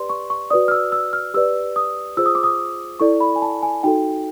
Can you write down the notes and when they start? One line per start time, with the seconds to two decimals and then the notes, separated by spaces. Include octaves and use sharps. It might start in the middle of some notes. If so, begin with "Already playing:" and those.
Already playing: G4 B4 D5 C6
0.10 C#6
0.30 C#6
0.50 F#4 B4 D5 D#6
0.68 F6
0.71 E6
0.92 E6
1.13 F6
1.34 G4 B4 D5 E6
1.76 D#6
2.17 F4 G#4 C5 E6
2.26 D#6
2.35 D6
2.44 D#6
3.00 E4 A4 D5 C#6
3.20 B5
3.36 G#5
3.42 A5
3.63 G#5
3.83 D#4 F#4 A4 G5